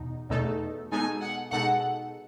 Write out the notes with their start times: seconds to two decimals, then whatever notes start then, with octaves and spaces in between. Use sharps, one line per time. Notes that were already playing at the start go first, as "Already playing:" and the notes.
Already playing: E2 B2 D#4
0.29 E2 B2 A3 D#4 A4
0.92 B2 G#3 D#4 A4 G#5
1.22 F#5
1.52 B2 G#3 D#4 A4 F#5